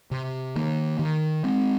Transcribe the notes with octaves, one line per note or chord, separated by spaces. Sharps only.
C3
D#3 A#3
D#3
G#3 C4